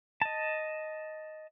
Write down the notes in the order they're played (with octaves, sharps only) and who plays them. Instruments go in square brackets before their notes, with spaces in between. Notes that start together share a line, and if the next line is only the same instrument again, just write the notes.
[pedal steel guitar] D#5 A5